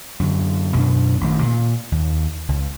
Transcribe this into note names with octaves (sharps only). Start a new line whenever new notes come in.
F#2 D3
F#2 B2 D4
A1 D#3
A#2
D#2
C#2